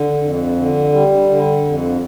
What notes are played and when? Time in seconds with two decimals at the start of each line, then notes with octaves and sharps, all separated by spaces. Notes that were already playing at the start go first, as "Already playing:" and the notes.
Already playing: D3
0.22 F2
0.57 D3
0.93 G3
1.29 D3
1.65 F2